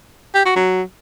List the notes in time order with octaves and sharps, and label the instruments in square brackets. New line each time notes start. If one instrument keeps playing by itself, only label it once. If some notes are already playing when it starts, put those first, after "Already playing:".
[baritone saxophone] G4
F#4
F#3